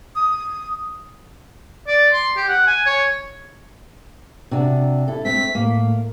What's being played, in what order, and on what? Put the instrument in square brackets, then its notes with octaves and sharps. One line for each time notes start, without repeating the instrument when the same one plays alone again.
[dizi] D#6
[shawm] D5
C6
G4
F#5
G#5
C#5
[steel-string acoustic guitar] C3 D4 F#4
E4 A4
[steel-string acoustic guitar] A3 C4 [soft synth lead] B6
[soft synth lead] A2 [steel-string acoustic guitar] A#3